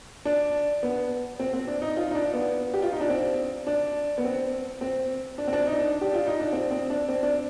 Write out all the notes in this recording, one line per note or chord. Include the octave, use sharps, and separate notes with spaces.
D4
B3
C4
C4
D4
D#4
F4
D#4
D4
B3
G4
F4
D#4
D4
C4
D4
B3
C4
C4
D4
C4
D4
D#4
D4
G4
F4
D#4
D4
C4
C4
D4
C4
D4